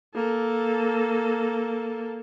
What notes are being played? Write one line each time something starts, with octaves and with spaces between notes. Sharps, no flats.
A#3 A4